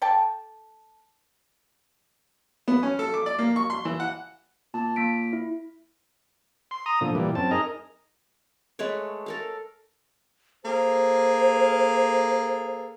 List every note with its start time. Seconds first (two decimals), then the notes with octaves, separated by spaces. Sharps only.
0.02 A4 D5 G5 A5
2.68 B3
2.83 C#4
2.99 A4
3.14 D6
3.26 D5
3.39 A#3
3.56 C#6
3.70 C6
3.85 E3
4.00 F#5
4.74 A#2 A5
4.96 A#3 B6 D7
5.33 E4
6.71 C6
6.86 A#5 D#6
7.01 A#2 D3 F3
7.15 A#2 E3 G3
7.35 F#2 C4 A5
7.51 D#4 G#4 A#4 D#5 A#5
8.79 G#3 A3 B4 C#5
9.26 A4 A#4 F5
10.64 A#3 G#4 A4 C5